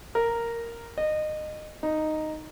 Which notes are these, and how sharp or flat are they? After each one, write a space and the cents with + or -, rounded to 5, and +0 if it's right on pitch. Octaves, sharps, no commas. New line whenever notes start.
A#4 -5
D#5 -25
D#4 -5